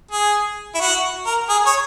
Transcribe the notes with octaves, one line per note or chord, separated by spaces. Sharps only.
G#4
E4
F#4
A#4
G#4
C#5